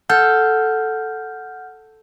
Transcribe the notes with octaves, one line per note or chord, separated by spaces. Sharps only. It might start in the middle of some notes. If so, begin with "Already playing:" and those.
A4 F#5 F6 G6